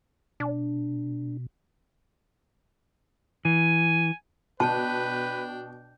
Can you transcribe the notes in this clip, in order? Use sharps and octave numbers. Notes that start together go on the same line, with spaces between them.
B2 D4
E3 G#5
B2 D4 B4 G5 A5